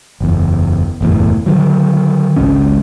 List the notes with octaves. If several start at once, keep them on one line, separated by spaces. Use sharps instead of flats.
F#1 E2
F#1 E2 A2
D3 D#3 F#3
G#1 C#2 G#2 C#4